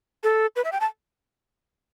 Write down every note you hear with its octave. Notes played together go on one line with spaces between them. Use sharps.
A4
B4
E5
G5
A5